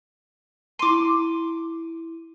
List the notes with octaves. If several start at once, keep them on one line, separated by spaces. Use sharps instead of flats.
E4 C6 D6 D#7